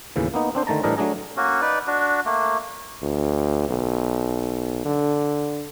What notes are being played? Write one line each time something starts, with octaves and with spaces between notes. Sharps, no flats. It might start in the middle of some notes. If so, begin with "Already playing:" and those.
D#2 A2 C#3 E3
A#3 B3 D#4
C4 D4 C5
D3 D#3 A3 A5 A#5
A2 E3 G3 D4 A#4 D#5
F#3 A3 D4 G#4 A#5
A#3 C#4 F#4
D#4 B4 D5
D4 F#4
A3 A#3
D2
B1
D3